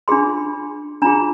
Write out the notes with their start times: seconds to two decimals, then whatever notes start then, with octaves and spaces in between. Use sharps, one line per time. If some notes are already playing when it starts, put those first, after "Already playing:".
0.08 D4 F4 G#4 C6
1.02 D4 F4 G#4 A#5